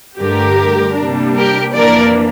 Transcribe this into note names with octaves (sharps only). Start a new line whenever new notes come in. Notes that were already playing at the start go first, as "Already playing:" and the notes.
G2 D3 A3 G4 A#4
C3 G3 A#3 D4
G4 A#4
F2 E3 A#3 D4 A#4 D5